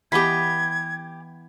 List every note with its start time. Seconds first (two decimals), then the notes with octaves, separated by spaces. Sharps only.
0.12 E3 B3 G4 D#5 B5 G#6